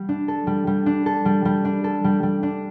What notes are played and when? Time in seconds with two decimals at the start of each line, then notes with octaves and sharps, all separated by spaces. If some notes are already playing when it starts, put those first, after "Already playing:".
Already playing: G3
0.09 D4
0.28 A4
0.47 G3
0.67 G3
0.86 D4
1.06 A4
1.25 G3
1.45 G3
1.65 D4
1.84 A4
2.04 G3
2.23 G3
2.43 D4